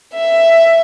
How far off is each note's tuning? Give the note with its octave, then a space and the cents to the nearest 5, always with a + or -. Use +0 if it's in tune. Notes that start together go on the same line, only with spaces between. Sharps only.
E5 +10